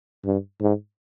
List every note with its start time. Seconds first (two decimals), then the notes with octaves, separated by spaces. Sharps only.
0.25 G2
0.61 G#2